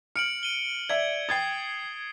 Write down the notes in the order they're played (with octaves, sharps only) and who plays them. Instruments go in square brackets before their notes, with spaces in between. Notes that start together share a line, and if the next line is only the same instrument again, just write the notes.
[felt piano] F6 [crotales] C#7 D7 F#7
[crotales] D#7 G7
[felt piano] D5 E5 [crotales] G#6
[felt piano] G5 G#6 A6 [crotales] D#6 C7